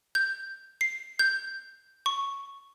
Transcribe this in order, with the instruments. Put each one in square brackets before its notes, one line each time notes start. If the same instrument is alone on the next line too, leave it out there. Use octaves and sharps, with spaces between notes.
[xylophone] G6
C7
G6
C#6